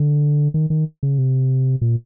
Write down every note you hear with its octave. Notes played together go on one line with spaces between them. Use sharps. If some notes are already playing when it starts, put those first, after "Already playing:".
Already playing: D3
D#3
D#3
C#3
C3
A#2